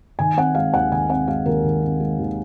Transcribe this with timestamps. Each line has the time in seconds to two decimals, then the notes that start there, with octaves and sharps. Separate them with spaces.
0.19 D#3 G#5
0.37 C4 F#5
0.55 G#3 F5
0.74 D#2 F#5
0.92 D#3 G#5
1.09 C4 F#5
1.28 G#3 F5
1.46 D#2 A#4
1.64 D#3
1.82 C4
2.00 G#3
2.19 D#2